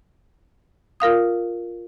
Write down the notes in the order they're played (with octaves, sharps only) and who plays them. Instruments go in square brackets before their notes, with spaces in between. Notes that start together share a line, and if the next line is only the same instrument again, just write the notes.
[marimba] F4 A#4 F5 D#6